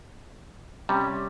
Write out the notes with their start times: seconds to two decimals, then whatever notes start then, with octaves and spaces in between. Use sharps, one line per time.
0.89 C3 G3 C#4